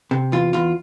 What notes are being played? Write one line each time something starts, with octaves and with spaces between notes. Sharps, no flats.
C3
E2 F4
E2 F4